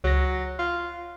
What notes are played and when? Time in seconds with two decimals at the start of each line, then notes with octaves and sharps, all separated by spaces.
0.04 C#2 F#3 A#6
0.59 F4